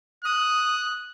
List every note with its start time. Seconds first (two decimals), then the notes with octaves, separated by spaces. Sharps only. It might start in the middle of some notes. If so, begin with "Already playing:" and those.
0.25 D#6 F#6